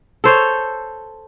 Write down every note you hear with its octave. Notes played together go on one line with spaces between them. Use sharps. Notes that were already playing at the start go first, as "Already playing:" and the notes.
A4 C5 C#5